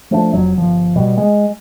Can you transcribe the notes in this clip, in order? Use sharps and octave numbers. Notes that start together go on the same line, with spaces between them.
F3 A3 C4 D4
F1 F#3
G1 F3
B2 G3
G#3